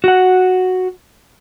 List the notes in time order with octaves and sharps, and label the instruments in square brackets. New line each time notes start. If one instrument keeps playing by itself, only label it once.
[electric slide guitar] F#4 F#5